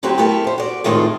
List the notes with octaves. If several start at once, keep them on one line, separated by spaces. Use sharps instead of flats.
D3 F#3 C4 E4 F#4 G4
A3 B3 E4 G4 A4 A#4
F2 C5
F#4 D5
F2 A2 D#3 G#3 A3 F4